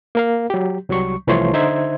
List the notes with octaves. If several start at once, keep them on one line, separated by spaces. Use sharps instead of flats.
A#3 A#4 F5
F#3 G4
C2 F#3 G3 C#6
C2 E3 F3 A3 C#5 C6
D3 D#4 C5 E5 G#6